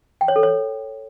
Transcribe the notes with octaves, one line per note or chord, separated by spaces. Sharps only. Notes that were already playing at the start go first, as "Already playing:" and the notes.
G5
C#5
A4
C#5